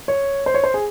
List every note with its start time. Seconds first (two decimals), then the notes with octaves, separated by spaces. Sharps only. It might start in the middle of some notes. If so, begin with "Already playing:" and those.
0.08 C#5
0.46 C5
0.54 C#5
0.64 C5
0.74 G#4